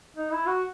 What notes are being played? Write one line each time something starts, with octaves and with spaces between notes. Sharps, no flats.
D#4
E4
F#4